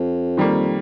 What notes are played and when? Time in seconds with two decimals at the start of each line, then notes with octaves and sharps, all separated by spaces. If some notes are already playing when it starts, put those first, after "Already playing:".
Already playing: F2
0.37 D#3 G3 A#3